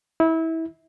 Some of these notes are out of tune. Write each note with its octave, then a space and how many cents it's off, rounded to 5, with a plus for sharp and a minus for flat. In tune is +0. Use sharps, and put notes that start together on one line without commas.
E4 -25